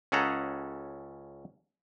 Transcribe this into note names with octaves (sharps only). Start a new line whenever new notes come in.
C#2 C#4 G#4 A4 F#5 A#5